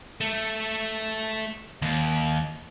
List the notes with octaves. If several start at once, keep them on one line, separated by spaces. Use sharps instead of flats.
A3
D#2